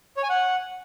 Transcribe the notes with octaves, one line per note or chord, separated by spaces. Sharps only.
C#5
G#5
F#5